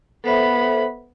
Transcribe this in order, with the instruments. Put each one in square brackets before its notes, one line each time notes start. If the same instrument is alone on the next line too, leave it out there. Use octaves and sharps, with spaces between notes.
[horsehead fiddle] B3 B5 [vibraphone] A4 C5 E5